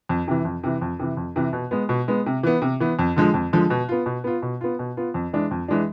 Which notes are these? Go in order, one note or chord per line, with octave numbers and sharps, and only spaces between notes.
F2
C3 E3
F2
C3 E3
F2
C3 E3
F2
C3 E3
B2
G#3 B3
B2
G#3 B3
C3
E3 B3
C3
E3 B3
F2
D3 F3 G#3
F2
D3 F3 G#3
B2
B3 F4
B2
B3 F4
B2
B3 F4
B2
B3 F4
F2
E3 G#3 D4
F2
E3 G#3 D4